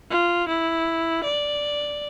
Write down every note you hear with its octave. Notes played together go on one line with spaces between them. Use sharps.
F4
E4
D5